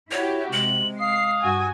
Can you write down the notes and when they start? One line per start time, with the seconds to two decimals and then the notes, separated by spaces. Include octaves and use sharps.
0.11 E4 F#4 G4 C#5
0.53 C3 G#3 F#7
1.00 F5 D#6 C7
1.41 G2 F#4 G#5